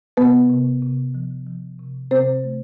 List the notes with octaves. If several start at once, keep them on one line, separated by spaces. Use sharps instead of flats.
C3 B3 B4
C3
C3
F3
F3
C3
C3 C4 C5
A3